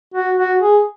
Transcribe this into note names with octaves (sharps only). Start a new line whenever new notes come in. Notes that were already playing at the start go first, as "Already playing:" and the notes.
F#4
F#4
G#4